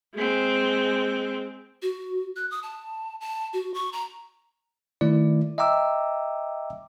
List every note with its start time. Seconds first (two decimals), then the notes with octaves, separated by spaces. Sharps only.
0.15 G#3 C4
1.82 F#4
2.36 F#6
2.51 D#6
2.63 A5
3.21 A5
3.53 F#4
3.74 C#6
3.93 A#5
5.01 D#3 A3 E4 D5
5.58 D#5 E5 G5 A#5 D6 E6